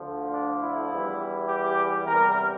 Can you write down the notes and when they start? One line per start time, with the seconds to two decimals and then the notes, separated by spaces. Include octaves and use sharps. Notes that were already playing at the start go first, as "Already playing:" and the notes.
Already playing: D2 D3 F3
0.33 D4
0.62 E4
0.92 E2 E3 G3
1.49 G4
2.07 E2 C3 G3 A#4